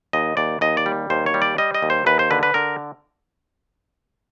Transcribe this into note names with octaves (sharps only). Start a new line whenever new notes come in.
D#2 D#5
D#2 D5
D#2 D#5
D5
G3
D#2 C5
C#5
G3
D5
G3 D#5
D#5
D#2
C5
D#2 B4
C5
D3 B4
B4
D3 A#4